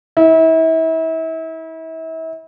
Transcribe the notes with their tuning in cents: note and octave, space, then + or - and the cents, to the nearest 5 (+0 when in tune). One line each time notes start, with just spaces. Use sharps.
E4 -35